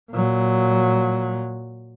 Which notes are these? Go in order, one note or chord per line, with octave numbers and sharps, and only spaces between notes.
A#2 F#3